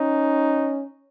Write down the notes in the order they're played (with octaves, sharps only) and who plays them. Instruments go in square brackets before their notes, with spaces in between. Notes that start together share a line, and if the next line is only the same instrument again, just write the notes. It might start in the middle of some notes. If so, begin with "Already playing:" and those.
Already playing: [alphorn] C#4 [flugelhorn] D#4